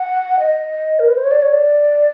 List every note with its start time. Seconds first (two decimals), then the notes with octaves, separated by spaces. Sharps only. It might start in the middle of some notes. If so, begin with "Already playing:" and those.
Already playing: F#5
0.39 D#5
0.99 A#4
1.08 B4
1.16 C5
1.24 C#5
1.31 D5
1.42 C#5
1.52 D5